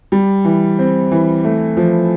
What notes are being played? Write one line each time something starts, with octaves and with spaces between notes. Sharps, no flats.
G3
E3
C4
E3
A3
F3